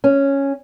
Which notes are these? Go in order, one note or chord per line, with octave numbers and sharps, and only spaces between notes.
C#4